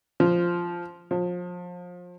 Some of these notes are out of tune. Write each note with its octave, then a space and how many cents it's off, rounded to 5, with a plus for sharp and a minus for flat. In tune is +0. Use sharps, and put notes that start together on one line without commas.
F3 -5
F3 +30